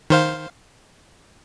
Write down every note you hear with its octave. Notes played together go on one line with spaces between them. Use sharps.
D#3 C5 F5